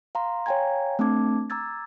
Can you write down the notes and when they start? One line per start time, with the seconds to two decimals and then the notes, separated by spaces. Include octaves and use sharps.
0.15 F5 A#5 C6
0.46 C#5 F5 G5 G#5 A#5 G#6
0.99 A3 C4 D4 A5 D6 G#6
1.50 A#5 D6 E6 G#6 A6